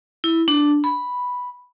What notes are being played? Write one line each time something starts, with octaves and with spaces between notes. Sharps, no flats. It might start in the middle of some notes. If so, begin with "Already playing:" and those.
E4
D4
B5